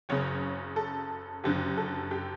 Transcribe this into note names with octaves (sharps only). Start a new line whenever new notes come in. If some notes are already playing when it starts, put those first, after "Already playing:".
F#1 F#2 C#3 C#5
A4
F#1 F#2 D3 G4
A4
G4